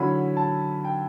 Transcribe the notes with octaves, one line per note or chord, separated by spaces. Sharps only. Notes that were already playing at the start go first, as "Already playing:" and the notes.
Already playing: D3 F#3 C#4 E4 B5
A5
G5